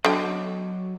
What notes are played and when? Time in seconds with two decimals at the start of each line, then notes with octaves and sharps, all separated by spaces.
0.05 D3 F#3 D#5 G5